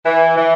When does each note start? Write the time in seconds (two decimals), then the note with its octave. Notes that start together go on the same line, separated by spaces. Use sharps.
0.04 E3
0.36 E3